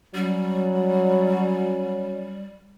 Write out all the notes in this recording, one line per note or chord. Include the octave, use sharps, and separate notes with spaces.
F#3 G3 C#4 F#4 C#5